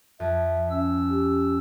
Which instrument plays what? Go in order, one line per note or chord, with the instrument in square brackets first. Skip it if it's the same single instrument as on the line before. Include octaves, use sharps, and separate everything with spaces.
[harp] F2 [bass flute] E5
[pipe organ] C#4 E6
[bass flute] G4